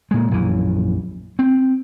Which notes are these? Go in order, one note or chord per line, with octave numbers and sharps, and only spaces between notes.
A#2 G#3
A#1 F#2 E3
C4